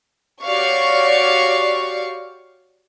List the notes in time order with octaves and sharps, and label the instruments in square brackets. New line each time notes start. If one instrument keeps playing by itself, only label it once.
[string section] F#4 G4 C#5 D5 F5 C#6